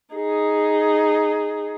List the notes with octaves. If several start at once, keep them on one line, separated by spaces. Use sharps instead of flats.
D#4 G#4